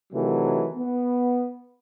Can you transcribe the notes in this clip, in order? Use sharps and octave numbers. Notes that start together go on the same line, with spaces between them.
C3 D#3 E3 F#3 A3
B3